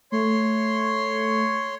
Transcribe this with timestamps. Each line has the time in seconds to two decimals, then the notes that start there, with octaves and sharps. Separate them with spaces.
0.12 A3 C#5 C6